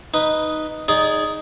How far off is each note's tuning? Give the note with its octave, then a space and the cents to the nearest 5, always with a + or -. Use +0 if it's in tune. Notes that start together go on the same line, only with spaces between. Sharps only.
D#4 +0 B4 +0
D#4 +0 G#4 +0 D5 -25